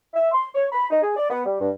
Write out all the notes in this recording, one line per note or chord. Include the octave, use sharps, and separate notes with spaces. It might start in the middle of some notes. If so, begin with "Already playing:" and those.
E5
C6
C#5
B5
D#4
G#4
D5
B3
G3
G2